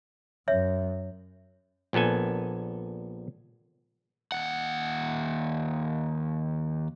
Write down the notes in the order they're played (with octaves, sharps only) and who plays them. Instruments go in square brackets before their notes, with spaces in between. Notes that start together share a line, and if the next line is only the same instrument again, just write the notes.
[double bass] F#2 [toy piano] C#5 E5
[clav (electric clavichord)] A#1 A#2 B3 A4 G#5
[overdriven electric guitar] D#2 F#5